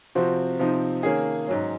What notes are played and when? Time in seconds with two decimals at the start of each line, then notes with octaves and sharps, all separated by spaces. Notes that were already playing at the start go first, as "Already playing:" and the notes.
0.15 C3 F3 C4 F#4
0.59 C3 F3 C4 D#4
1.03 D#3 A#3 C#4 G#4
1.47 G#2 F#3 C#4